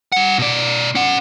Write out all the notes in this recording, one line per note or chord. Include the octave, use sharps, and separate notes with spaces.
G3 F#5
B2 D5
C#4 F#5